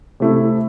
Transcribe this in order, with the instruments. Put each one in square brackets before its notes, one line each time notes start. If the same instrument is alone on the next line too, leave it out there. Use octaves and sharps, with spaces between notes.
[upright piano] C3 A3 E4